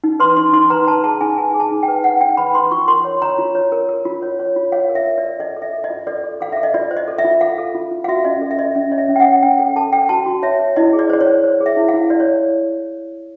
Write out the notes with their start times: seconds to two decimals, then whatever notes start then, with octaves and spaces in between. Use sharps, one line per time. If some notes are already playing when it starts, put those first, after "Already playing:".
0.04 D#4
0.20 B4 C6
0.36 D#4 C6
0.53 D#4 C6
0.70 B4 A#5
0.87 B4 A5
1.03 G#4 A5
1.21 D#4 G#5
1.38 B4 G#5
1.54 G#4
1.60 A5
1.71 D#4
1.83 G5
1.88 B4
2.04 B4 F#5
2.21 D#4 G5
2.37 B4 B5
2.54 B4 C6
2.71 F4 C#6
2.88 A#4 C6
3.05 C#5
3.22 C#5 A#5
3.38 F4
3.55 C#5
3.72 A#4
3.89 A#4
4.05 F4
4.22 C#5
4.39 C#5
4.56 F4
4.72 C#5 F5
4.89 A#4
4.95 E5
5.06 A#4
5.18 D5
5.24 A#4
5.39 A4 D#5
5.57 A4
5.62 E5
5.73 A4
5.84 D#5
5.90 F4
6.07 A4 D5
6.24 A4
6.41 A4 F5
6.52 A4 E5
6.63 D#5
6.74 F4 D5
6.91 C5
6.97 D#5
7.08 A4
7.18 E5
7.25 F4
7.41 A4 F5
7.58 A4
7.75 F4
7.91 F4
8.04 F5
8.08 F#4 E5
8.24 C#4 D#5
8.41 A4
8.51 E5
8.59 A4 D#5
8.75 C#4 E5
8.92 C#5 D#5
8.98 E5
9.08 C#4
9.16 G5
9.20 F#5
9.26 C#5
9.43 C#4 G5
9.59 A4 G5
9.76 A4 A5
9.93 A4 G5
10.09 F#4 A5
10.26 F#4
10.43 C#5 E5
10.60 C#5
10.76 E4 D#5
10.93 G#4
10.99 D5
11.10 C5 D5
11.21 C#5
11.27 C5
11.44 C5
11.60 G#4
11.66 E5
11.77 E4
11.88 F5
11.94 E4
12.10 E4 D5
12.20 C#5